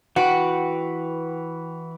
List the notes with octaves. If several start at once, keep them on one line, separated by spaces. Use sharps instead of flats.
E3 F#4 B4 G5